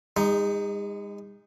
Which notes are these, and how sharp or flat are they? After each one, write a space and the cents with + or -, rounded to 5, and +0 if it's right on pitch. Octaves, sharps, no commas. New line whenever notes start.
G#3 -40 D#4 +0